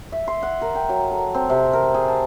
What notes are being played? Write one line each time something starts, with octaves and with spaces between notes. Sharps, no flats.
E5
C6
F#5
A#4
G5
F#3
A4
C4
C3
A#4
G#4
A5